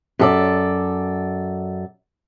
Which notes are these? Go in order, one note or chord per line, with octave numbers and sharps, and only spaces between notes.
F#2 A4 D5